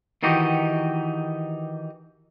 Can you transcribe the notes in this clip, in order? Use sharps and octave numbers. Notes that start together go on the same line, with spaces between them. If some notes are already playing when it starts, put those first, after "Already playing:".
D#3 E3 D#4 F#4 G4